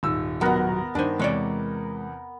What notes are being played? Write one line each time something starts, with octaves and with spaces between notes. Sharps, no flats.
D#1 G#2 E6
B2 F#3 B3 A#4 A#5
G2 D#3 D4 C5 G#5
E2 C3 G#3 C#5 D5